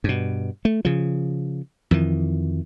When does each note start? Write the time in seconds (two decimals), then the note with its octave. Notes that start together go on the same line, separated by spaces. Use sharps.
0.04 G2 B2
0.65 A3
0.85 C#3 F3
1.91 F2 D#3 E3